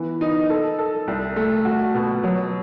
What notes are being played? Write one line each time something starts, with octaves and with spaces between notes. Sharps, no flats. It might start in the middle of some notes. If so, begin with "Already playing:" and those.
Already playing: E3 B3
D#4
A4
A4
C2
A3
F#4
B2
F#3